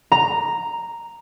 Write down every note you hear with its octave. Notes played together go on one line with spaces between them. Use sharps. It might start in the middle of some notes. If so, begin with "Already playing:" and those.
A#5